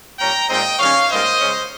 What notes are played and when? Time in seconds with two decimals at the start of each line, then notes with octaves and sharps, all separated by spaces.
0.19 A#2 G3 C#4 G5 A#5
0.49 A#2 G#3 C4 D#4 D#5 G5
0.79 D#3 G3 C#4 C#5 F5
1.09 G#2 G3 A#3 C5 D#5
1.40 C#3 G#3 C#4